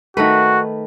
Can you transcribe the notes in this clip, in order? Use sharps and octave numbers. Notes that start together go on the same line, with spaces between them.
D#3 A3 F#4 B4